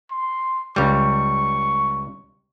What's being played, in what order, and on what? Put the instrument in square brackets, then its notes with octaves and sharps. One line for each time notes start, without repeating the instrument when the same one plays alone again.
[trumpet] C6
[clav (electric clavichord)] C#2 G3 [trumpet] C#6